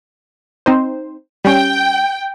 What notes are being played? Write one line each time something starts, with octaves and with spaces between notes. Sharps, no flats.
C4 D#4 C5
G3 C#4 G5